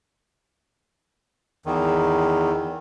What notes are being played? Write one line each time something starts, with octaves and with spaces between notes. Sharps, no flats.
E2 D#3